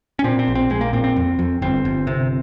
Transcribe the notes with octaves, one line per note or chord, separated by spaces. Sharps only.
C#4
A#2 C4
C4
A#1
C4
A#1 G#3
A#3
A#2 C4
C4
F2
F2
G1 C4
G1
C3